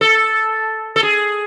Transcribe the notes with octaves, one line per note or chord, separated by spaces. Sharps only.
A4
A4
G#4